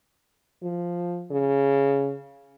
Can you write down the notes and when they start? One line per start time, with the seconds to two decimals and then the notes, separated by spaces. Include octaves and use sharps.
0.63 F3
1.31 C#3